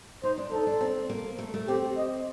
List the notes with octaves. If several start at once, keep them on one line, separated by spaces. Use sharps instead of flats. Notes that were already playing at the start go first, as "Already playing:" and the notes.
D#4 C5
D4
D#4 A4
D4
C4
A#3
A3
A3
C4 G4
D#5